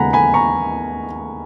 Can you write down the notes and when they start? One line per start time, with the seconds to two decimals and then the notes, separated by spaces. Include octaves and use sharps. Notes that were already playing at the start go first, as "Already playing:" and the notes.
Already playing: D#2 C#3 G#3 B3 F#5 G#5 A#5 B5
0.13 G#5 B5
0.34 A#5 C#6